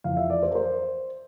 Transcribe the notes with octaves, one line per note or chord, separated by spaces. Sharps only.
F2 E3 F5
E5
D5
C5
A#4
C5